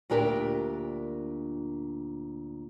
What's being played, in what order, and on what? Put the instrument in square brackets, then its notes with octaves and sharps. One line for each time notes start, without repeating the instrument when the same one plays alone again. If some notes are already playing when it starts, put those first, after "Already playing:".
[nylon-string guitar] D2 A#2 D4 G4 A#4